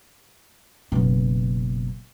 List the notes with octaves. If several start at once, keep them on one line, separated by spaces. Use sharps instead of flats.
F#1 B2